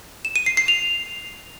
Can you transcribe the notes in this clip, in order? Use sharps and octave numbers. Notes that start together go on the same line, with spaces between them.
E7
D#7
C7
C7
F7